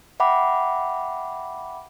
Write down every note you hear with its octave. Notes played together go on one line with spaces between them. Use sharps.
E5 F#5 G5 B5 D6